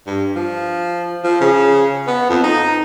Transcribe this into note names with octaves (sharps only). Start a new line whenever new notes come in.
G2
F3
F3
C#3
B3
F2
D#4